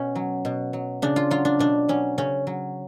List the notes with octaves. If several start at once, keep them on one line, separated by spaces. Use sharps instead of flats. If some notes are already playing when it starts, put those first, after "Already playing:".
Already playing: B2 C#4
F#3
B2
F#3
C#3 D4
F4
F#3 F4
D4
B2 D4
F#3 C#4
C#3 C#4
F#3